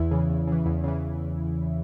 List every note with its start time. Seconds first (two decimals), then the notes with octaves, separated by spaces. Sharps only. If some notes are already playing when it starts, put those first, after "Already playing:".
Already playing: E2 E4
0.11 C#3 E3
0.29 E2
0.47 C#3 E3
0.66 E2
0.84 C#3 E3